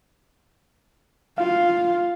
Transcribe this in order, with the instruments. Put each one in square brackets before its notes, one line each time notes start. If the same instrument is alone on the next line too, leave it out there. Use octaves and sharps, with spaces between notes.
[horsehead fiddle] F4 [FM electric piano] F5